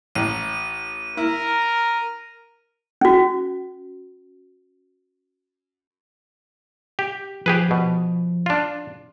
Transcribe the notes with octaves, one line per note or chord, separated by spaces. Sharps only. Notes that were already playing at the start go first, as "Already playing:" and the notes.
A1 D#7
E4 A#4
C#4 F#4
G4
F3 G4 G#4 B4
B2
D4 F4